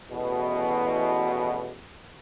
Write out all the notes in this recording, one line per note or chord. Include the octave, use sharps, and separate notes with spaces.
A1 E2 B2